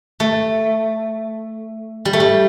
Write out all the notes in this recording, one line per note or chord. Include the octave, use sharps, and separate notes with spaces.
A3
G3
A3
G3